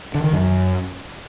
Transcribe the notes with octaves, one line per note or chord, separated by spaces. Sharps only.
D3
D#3
F#2